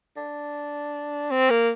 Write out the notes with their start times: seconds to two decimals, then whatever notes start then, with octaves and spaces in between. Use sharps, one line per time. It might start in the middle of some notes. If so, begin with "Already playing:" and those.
0.17 D4
1.31 C4
1.50 A#3